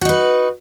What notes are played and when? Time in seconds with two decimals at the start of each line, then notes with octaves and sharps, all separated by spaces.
0.01 F#4
0.05 D#4
0.09 B4